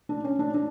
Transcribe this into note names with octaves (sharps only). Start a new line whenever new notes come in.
D4
C#4
D4
D4